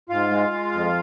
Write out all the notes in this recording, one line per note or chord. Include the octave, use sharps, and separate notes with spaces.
G#2 F4 F5
G#3
G#3
F2